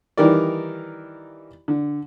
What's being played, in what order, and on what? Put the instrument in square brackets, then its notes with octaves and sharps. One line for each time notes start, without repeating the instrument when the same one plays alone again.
[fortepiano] D#3 E3 G3 D#4 A#4 D5
D3